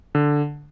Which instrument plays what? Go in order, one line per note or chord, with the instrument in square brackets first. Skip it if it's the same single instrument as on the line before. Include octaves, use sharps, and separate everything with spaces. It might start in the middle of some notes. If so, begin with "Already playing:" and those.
[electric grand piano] D3